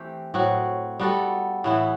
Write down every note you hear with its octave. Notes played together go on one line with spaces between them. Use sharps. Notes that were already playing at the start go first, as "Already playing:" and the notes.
Already playing: E3 A3 C4 G4
A2 F#3 C4 F#4
G3 B3 F#4 A4
A2 E3 B3 E4